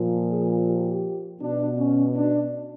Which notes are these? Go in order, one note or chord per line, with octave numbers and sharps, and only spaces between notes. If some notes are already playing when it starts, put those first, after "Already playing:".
Already playing: A#2 F3
G#4
G4
B2 D4
C#4
D4